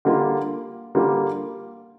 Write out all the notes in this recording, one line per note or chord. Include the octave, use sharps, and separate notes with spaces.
D3 G3 A#3 F4
D3 G3 A#3 F4